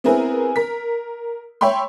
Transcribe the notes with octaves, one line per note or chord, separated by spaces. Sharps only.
B3 C4 E4 G#4 A#4 B4
A#4 B6
C#5 E5 G5 B5 C6